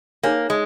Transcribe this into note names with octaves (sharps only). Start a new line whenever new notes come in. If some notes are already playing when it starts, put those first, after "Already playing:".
A#3 D#4 G#4 C#5 G#5
G#3